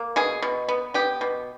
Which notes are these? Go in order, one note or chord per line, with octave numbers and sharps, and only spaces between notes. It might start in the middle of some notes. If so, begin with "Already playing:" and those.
Already playing: A#3
B2 G#4
B2
B3
B3 G4
B2